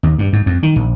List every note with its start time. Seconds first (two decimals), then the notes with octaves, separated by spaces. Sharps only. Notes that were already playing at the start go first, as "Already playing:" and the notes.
0.03 D#2
0.18 G2
0.33 G#2
0.46 F2
0.63 D#3
0.76 A#1